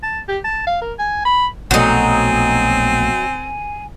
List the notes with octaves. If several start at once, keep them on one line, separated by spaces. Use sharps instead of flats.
A5
G4
A5
F5
A#4
G#5
B5
A#1 B2 F#3 A3 C4 D#4 G#5